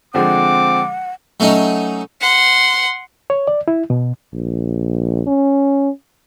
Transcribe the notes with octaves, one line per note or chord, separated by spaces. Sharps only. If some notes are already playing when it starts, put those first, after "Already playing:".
D3 F3 G#3 C4 F#5 D6
F#3 A3 C#4 D#4
F#5 C6
C#5
D5
E4
B2
A#1
C#4